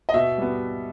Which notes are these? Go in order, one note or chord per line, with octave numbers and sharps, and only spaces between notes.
D#5
B2 E5
G3 B3